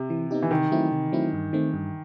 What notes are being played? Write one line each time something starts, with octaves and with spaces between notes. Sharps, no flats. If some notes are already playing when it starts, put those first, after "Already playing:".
Already playing: C3
E3
B3 D#4 G4
E3
C3 D#3
F#3 A3 C4 E4
C3
F#3 A3 C4 E4
G2
D#3 A3 C4
G2